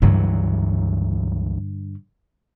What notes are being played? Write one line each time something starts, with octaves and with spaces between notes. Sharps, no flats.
C#2 G2 D3 E3 F#3